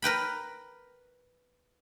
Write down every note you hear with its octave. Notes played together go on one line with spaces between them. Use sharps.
A#4 B4 G5 B5